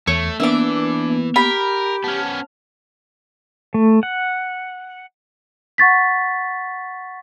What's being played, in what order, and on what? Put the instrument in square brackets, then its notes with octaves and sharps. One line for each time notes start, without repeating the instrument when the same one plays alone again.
[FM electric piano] E2 [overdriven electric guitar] A3 [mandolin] C#5
[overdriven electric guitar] E3 [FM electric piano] A#3 B3 [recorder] D4 [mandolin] E5 D6
[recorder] G4 [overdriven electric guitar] A#4 [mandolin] B5
[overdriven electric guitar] B3 C#4 [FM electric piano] A5 F6
[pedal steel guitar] A3
F#5
[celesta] F#5 C#6 A6 B6